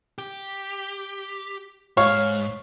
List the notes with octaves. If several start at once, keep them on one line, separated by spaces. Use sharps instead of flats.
G4
G#2 C#5 F5 C#6